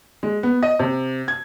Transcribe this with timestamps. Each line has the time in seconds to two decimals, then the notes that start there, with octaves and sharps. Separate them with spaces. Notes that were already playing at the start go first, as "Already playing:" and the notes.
0.23 G#3
0.43 B3
0.63 D#5
0.79 C3
1.28 G#6